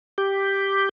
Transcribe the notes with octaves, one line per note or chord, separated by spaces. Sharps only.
G4